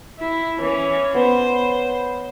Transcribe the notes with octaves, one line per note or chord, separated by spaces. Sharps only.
E4
E3 C#4 C#5
B3 C5 C#6